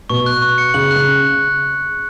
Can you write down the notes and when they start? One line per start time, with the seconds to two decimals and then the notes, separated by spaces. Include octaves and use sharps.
0.10 B2 C#6
0.26 F#6
0.42 C#6
0.58 C#7
0.74 C#3 F#7
0.91 C#3 F#6